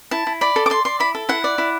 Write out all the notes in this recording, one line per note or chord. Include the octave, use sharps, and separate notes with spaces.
E4 A5
E4
D5 B5
A4
D6
D5 C6
D5 C6
E4 B5
A4
E4 F#5
D5
E4